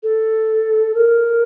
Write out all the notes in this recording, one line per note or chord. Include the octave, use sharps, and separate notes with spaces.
A4
A#4